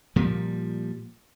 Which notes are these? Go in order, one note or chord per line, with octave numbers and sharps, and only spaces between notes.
A#2 F3 G3